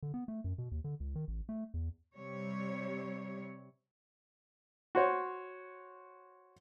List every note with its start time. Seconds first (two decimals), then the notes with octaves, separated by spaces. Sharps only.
0.03 D3
0.14 B3
0.28 A3
0.44 F#2
0.58 B2
0.72 D#2
0.84 D3
1.00 C#2
1.15 D#3
1.28 A1
1.49 A3
1.74 E2
2.16 C3 G3 C#5
4.95 F#4 C5 C#5